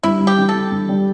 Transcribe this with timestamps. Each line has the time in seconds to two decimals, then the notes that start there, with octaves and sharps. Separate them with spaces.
0.03 G2 E4
0.20 G3
0.27 G4
0.38 E3
0.49 A4
0.55 G3
0.72 G2
0.89 G3